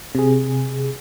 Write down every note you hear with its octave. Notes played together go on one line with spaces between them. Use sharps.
C3 G#4